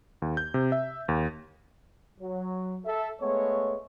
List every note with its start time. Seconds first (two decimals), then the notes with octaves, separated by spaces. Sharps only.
0.22 D#2
0.37 G6
0.54 C3
0.72 E5
1.08 D#2
2.21 F#3
2.86 A4 E5
3.20 G#3 A3 B3 C#5